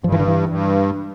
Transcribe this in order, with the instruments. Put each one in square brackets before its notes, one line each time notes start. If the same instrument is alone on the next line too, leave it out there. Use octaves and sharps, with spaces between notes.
[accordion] G2 [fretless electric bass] F3
[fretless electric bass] E3
D3
E3
[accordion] G2